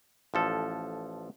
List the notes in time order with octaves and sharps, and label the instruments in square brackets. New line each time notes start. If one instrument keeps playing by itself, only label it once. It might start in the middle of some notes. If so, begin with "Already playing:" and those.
[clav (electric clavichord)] A1 F3 A4